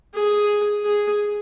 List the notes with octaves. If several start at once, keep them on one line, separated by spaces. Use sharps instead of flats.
G#4
G#4